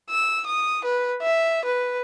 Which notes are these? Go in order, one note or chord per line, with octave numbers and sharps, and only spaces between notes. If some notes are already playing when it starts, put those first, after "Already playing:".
E6
D#6
B4
E5
B4